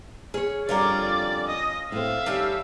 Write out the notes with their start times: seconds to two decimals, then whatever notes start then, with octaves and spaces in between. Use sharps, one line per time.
0.34 C#4 G#4 C#5
0.69 F2 D3 G3 C#4 F4 A#4 D5 D6
1.48 D#5
1.92 A2 C4 E5 F5
2.26 D#3 G3 A3 C#4